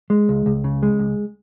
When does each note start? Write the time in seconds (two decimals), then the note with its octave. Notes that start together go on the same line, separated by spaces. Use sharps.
0.10 G#3
0.29 C#2
0.46 C#2
0.64 C#3
0.83 G#3
0.99 C#2